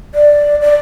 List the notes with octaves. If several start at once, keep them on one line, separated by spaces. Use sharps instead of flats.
D5
D5